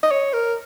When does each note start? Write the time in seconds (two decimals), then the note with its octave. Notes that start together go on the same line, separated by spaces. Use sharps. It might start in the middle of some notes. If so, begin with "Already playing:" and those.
0.03 D#5
0.11 C#5
0.33 A#4